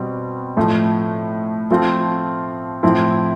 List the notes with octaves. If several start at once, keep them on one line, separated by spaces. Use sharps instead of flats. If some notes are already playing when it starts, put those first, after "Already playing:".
Already playing: B2 G3 C4
A2 F3 A3 E4
F3 A3 C4 F4
A2 F3 C4 E4